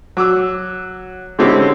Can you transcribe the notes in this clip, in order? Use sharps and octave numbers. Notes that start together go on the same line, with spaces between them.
F#3 D6 E6
D3 G#3 C4 C#4 E4 G4